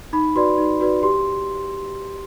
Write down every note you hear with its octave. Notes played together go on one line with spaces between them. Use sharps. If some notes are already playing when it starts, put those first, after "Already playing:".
D#4 B5
F#4 B4 D5 C6
D#4
F#4 B4 D5
G4 C6